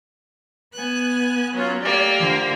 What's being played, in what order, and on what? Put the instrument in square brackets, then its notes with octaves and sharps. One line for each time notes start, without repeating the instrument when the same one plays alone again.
[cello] B3 [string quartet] G#5 F#6
[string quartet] F#3 C#4 F4
[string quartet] A3 A#3 G4 [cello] D5
[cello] D3 F3